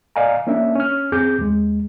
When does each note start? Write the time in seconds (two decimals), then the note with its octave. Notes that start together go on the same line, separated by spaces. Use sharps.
0.16 D5 D#5 F5 G#5 A#5
0.47 A#3 C#4 D4 E5
0.76 C#4 F6
1.12 F2 C4 G#4 D6 G6
1.39 D#2 G#3